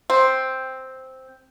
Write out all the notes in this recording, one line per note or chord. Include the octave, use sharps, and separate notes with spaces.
C4